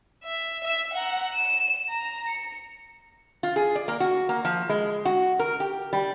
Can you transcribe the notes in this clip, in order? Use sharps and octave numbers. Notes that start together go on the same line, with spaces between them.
E5
E5 E7
F#5 A#5
E7
A#5
C#7
F4
G#4
D5
A#3
F#4
A#3
F3
G#3
F#4
A#4
G4
G3